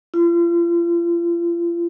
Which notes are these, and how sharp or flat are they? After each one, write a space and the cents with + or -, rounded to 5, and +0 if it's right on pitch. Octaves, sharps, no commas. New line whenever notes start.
F4 -35